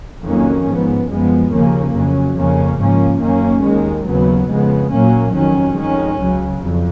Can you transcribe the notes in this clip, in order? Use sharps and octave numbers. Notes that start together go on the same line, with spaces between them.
F2 D#3 F#3 A#3 C#4
G#2 F3 B3
F#2 F3 G#3 B3
D#2 C#3 F3 A#3 C#4
F2 C#3 F#3 C#4
F2 C#3 F3 A#3 C#4
G#2 F3 A#3 C#4
F#2 D#3 A#3 C#4
D#2 D#3 G#3
D#2 C#3 F#3 B3
F2 C#3 G#3 B3
A#2 F#3 A#3 C#4
F2 D#3 F#3 C#4
F2 D#3 G#3 C#4
C#2 C#3 F#3
F2